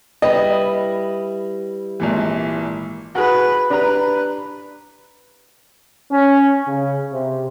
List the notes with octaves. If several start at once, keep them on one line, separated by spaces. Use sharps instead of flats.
G3 E4 B4 D#5
G#1 A#2 E3
F#4 G#4 B4
D4 G4 B4 A#5
C#4
C#3
C3